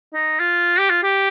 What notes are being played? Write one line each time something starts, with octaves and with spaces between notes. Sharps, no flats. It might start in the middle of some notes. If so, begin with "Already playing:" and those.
D#4
F4
G4
F4
G4